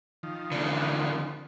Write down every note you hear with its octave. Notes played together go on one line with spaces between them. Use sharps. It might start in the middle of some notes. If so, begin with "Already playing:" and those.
D#3 F3
E2 D3